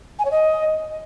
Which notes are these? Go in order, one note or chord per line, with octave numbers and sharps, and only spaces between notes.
G#5
C#5
D#5